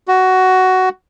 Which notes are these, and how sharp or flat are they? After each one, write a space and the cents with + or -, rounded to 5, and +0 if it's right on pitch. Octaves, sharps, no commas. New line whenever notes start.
F#4 +10